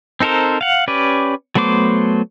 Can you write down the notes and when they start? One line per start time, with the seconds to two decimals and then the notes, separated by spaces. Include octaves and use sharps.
0.20 C4 D#4 A4 A#4 C5
0.61 F5 F#5
0.88 C#4 G4 B4 D5
1.55 F#3 A3 B3 C5 D6